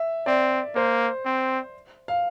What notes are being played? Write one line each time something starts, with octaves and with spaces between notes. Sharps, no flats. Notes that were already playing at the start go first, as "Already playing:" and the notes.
Already playing: E5
C4 D5
A#3 C5
C4
F5